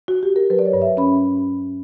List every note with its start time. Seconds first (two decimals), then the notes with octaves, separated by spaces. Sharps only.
0.08 F#4
0.23 G4
0.36 A#4
0.50 F#3 B4
0.59 D5
0.65 C#5
0.73 G2
0.82 E5
0.97 C#4 B5